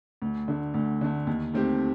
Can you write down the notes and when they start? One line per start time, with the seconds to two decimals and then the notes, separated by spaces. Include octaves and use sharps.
0.22 D2
0.48 D3 A3
0.74 D2
1.01 D3 A3
1.27 D#2
1.53 D#3 A3 C4 G4